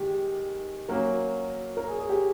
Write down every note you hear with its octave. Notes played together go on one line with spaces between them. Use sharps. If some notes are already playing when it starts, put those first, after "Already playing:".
Already playing: D#3 G#3 G4
F#3 A#3 C#4 F#4 A#4
A#4
G#4
G#4
G4